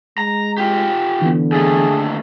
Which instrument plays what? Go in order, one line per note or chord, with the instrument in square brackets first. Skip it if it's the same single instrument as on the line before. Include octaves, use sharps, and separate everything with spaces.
[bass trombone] G#3 [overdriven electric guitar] A#5
[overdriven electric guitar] F4 G4
[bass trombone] D3 [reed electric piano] E3 B3
[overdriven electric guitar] D#2 A3 [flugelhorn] G#4